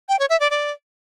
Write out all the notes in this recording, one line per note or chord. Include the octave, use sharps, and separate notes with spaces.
G5
C#5
E5
D5
D5